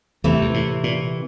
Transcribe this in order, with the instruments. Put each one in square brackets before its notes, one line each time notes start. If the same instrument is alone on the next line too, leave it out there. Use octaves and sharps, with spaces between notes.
[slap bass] E2 [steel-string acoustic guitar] C3 E3 A3
[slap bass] E2
A2
A#2